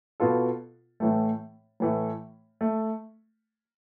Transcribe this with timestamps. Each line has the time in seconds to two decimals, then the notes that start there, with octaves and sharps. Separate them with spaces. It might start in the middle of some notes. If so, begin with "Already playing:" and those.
0.20 B2 B3 F4 A4
1.00 A2 E3 A3
1.80 A2 E3 A3
2.61 A3